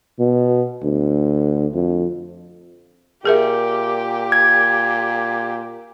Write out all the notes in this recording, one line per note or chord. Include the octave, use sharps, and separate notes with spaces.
B2
D2
F2
A#2 G4 G#4 A#4 E5
G#6